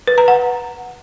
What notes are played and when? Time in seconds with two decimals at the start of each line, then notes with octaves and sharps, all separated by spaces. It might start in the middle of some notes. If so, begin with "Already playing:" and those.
0.07 B4
0.18 A#5
0.28 F#5